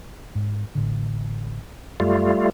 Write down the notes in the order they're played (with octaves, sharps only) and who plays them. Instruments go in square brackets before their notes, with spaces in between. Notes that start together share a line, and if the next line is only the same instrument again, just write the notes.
[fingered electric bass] G#2
A1 A2 D3
[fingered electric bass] F#2 [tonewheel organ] G3 A3 F4